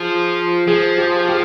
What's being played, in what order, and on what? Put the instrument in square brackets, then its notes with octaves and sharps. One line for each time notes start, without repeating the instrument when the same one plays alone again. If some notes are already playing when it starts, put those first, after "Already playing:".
Already playing: [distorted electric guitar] F3 [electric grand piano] G#4
[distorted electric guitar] F3 [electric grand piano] G#4
[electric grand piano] G4
G4